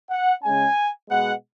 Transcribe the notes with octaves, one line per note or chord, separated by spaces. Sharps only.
F#5
C#3 G#3 C#4 G#5
B2 G#3 B3 F#5